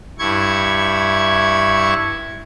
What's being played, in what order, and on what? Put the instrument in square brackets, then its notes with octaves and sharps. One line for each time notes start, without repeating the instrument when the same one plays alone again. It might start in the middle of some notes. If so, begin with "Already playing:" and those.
[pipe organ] G2 E4 C#6 G#6